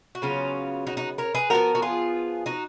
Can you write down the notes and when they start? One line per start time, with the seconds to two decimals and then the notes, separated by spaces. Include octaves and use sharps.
0.15 F#4
0.22 C#3 F#3 B3 C#4 F4
0.87 D#4 F#4
0.97 D#4 F#4
1.18 A#4 C#5
1.35 G#4 B4
1.50 F3 G#3 B3 F#4 A#4
1.75 F#4
1.82 F4 G#4
2.46 D#4 F#4